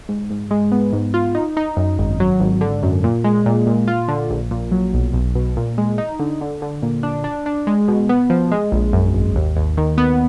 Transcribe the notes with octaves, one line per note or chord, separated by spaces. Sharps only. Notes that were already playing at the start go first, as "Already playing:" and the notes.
G#2
G#2
G#3
B3
G#2
F4
D#4
D#4
F#2
G#1
F#3
G#1
D3
F#2
A#2
G#3
A#2
A#2
F4
D3
A#1
A#2
F#3
B1
B1
B2
A#2
G#3
D#4
D3
D3
D3
A#2
D4
D4
D4
G#3
B2
B3
F3
G#3
A#1
F#2
G#1
D#2
D#2
D#3
B3